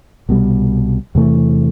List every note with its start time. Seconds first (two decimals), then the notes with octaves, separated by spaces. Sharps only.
0.29 C2 B2 G3
1.15 E2 C3 E3 A3